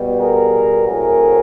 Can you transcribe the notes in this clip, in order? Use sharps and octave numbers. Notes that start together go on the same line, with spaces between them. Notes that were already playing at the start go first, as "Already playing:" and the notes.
Already playing: B2 G3 B3
G#4 A#4
A2 F#3 A3 C4 G#4 A#4